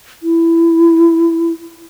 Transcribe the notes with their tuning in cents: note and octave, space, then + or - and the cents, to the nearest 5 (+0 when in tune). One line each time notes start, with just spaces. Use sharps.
E4 +15